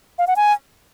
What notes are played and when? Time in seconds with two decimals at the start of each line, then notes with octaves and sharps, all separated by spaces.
0.18 F5
0.27 F#5
0.36 G#5